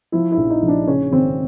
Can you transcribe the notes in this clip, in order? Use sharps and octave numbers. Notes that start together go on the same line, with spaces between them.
F3 E4
E4
A#1
D#4
A#1
D4
C#3 C#4
G#1 C4